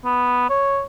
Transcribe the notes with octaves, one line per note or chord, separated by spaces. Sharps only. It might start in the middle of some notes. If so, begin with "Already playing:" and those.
B3
C#5